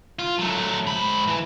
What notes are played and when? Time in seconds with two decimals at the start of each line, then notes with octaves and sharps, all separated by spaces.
0.19 F4
0.39 F#3 A3
0.86 G#2 B5
1.27 E3